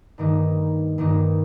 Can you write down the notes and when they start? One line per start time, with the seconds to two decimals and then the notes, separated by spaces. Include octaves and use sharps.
0.18 G2 D#3 A#3 D#4
0.98 G2 D#3 A#3 D#4